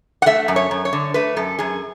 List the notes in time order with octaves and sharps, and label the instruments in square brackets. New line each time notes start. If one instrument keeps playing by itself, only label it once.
[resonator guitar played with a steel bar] F#5
A3 E5
F#2
C#5
F#2
C#5
D3
A3 B4
F#2 A4
F#2 G#4